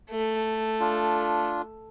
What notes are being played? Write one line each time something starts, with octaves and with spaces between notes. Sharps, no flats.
A3
D4 F4